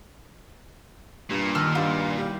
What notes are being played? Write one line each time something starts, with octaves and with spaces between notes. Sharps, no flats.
G2 A#2
D#3 G5 A5 E6 F6
G2 F4 B5 C6 G6
G3 E4 G4